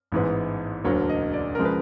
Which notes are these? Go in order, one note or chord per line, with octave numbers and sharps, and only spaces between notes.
A1 G#2 E3 G#3 B3
E1 D2 D3 F#3 A#3 C#5
D#5
D5
C#3 F3 G#3 A#4
B4